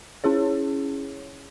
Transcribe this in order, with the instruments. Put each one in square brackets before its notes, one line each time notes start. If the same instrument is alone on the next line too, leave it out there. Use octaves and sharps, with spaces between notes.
[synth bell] C#4 E4 G#4 C#5